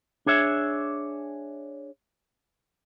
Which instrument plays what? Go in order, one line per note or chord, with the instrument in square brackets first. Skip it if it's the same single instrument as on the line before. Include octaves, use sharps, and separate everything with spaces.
[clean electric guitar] D4 G#4 C#5 E5